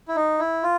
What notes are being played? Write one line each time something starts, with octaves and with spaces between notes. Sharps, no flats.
E4
D#4
E4
F4